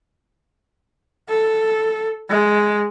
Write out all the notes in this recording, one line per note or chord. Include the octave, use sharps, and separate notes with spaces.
A4
G#3